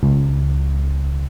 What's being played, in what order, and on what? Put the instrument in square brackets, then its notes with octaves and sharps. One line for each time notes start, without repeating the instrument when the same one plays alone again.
[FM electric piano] C#2